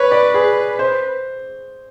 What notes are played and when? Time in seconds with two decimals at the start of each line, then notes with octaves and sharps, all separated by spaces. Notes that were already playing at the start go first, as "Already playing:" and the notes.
Already playing: B4 C#5
0.11 D5
0.34 G#4
0.79 C5